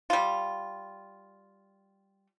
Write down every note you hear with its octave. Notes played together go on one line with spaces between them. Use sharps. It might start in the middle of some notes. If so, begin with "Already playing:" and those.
G3 F4